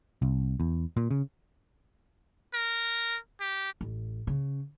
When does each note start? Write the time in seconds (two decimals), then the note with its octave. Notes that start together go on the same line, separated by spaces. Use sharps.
0.22 C2
0.60 E2
0.97 A#2
1.11 C#3
2.54 A#4
3.41 G4
3.81 A1
4.27 C#3